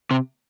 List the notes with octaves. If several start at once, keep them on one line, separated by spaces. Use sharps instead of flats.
C3